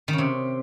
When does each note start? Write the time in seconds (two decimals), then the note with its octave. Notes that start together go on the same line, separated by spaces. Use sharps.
0.08 D#3
0.13 C#3
0.18 C3